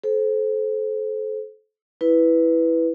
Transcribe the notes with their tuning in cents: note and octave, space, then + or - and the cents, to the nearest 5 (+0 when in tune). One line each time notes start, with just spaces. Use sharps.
A4 -30 C5 +0
E4 +0 B4 +0